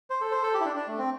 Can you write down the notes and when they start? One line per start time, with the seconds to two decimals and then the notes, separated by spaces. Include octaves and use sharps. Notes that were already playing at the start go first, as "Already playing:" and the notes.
0.10 C5
0.21 A4
0.31 C5
0.43 A4
0.54 G4
0.60 E4
0.66 D4
0.76 D4
0.88 A3
0.98 C4